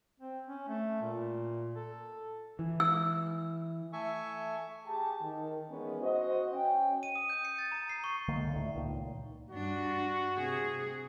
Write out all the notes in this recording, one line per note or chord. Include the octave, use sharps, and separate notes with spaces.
C4
C#4
A3
A#2
A4
E3
E6
A3 A4 E5 G#5 C#6
G4 G#4 G5 A5
D#3
D#3 E3 G#3 B3 C#4
F#4 C5 D#5
C#4 G5
D#7
D#6
G6
C#7
A6
A#5
C7
C#6
C#2 D3 G#3 A#3
D2 A2
C#2 A#2 D#3
G2 D4 F#4
C3 G#4